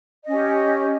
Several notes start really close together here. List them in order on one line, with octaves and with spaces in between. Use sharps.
D#5 C#4 G4